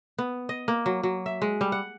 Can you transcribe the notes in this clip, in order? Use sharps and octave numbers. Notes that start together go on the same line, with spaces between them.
B3
D#5
A#3
F#3
F#3
E5
G#3
G3
F#5